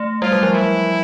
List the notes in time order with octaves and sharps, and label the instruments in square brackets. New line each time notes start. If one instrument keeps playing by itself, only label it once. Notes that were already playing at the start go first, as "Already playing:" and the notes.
Already playing: [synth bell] A3
[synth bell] G3 [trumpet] F4
[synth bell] F#3
F3
[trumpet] E4